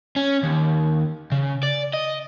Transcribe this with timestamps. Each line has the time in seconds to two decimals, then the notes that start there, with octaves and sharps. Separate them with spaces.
0.16 C#4
0.43 D#2
1.32 C#3
1.63 D5
1.94 D#5